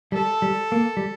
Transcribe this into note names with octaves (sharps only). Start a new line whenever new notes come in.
G3 A4
G3
A#3
G3